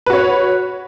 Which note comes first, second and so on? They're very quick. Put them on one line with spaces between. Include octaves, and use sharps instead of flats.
B4 F#4 C#5